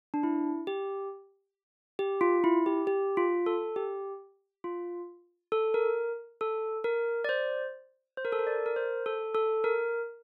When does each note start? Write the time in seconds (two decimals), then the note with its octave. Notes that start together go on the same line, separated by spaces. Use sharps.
0.14 D4
0.23 E4
0.67 G4
1.99 G4
2.21 F4
2.44 E4
2.66 G4
2.87 G4
3.17 F4
3.46 A4
3.76 G4
4.64 F4
5.52 A4
5.74 A#4
6.41 A4
6.84 A#4
7.24 D5
7.29 C5
8.17 C5
8.25 A#4
8.32 A4
8.39 A#4
8.47 D5
8.66 A#4
8.76 C5
9.06 A4
9.35 A4
9.64 A#4